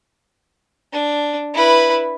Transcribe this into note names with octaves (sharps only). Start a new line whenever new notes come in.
D4
E4 B4